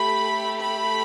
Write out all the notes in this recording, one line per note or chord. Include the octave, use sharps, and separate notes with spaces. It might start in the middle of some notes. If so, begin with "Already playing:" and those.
Already playing: A3 G4 B5
B5